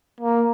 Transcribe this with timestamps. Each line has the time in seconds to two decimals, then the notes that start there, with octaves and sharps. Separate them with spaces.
0.21 A#3